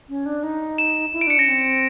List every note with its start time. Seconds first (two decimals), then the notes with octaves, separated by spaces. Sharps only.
0.09 C#4
0.26 D4
0.43 D#4
0.78 E7
1.13 E4
1.21 D7
1.27 D4 C#7
1.38 C#4 A#6
1.48 C4